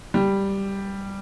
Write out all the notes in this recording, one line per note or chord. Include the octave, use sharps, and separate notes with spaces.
G3